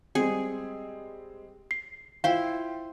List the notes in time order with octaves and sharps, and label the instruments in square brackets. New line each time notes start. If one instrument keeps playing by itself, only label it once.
[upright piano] G3 G#3 C4 [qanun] G#4
[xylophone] C7
[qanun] E4 C5 [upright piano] F4 G5 [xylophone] F5